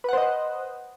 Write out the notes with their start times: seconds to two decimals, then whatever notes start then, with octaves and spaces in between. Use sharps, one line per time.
0.04 B4
0.09 F#5
0.13 C5
0.17 D#5